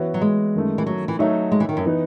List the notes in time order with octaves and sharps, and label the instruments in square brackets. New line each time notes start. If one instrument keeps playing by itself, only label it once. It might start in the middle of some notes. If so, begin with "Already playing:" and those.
Already playing: [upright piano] E3 B3 F#4 C#5 E5
[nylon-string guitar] F#3
G#3
[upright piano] F#2 D#3 A3
[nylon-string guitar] E3
F#3
E3
[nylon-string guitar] F#3 [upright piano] A3 D#4 F#4 C#5 E5
[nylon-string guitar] G#3
E3
D#3
F#2
[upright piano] E3 B3 D#4